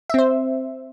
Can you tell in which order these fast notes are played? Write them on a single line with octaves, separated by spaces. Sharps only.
E5 C4 C5